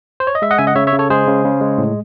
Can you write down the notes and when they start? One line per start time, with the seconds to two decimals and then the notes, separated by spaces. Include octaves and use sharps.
0.20 C5
0.27 C#5
0.35 D#5
0.42 G#3 E5
0.51 D#5 F#5
0.58 C#3 E5 G#5
0.67 D#5 F#5
0.75 C#3 C#5 E5
0.87 C#5 E5
0.93 C#3
0.99 A4 C#5
1.10 G#3 G#4 C5
1.27 C#3
1.45 C#3
1.61 G#3
1.78 A2